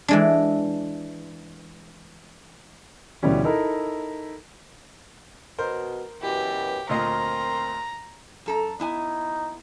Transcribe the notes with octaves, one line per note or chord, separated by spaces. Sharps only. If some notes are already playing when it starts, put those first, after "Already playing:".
E3 G#3 D4
D2 B2 E3 G3 C#4
D#4 E4 A4 A#4
B2 A#4 C5
F#2 B2 E3 G4
D2 A#2 C4 A#4 D#5 A#5 C6
F#2 A4 A#5
B3 D#4 E4 G#5